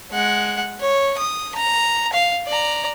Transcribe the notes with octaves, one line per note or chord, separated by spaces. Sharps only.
G#3 F#5
C#5
D#6
A#5
F5
D5 A#5